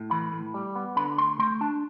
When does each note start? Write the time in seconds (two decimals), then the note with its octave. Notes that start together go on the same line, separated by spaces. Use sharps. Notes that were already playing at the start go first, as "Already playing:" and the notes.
Already playing: A2
0.11 E3 B5
0.33 A2
0.54 G3
0.75 B3
0.96 D3 B5
1.18 D2 C6
1.39 A3 C6
1.61 D4 A5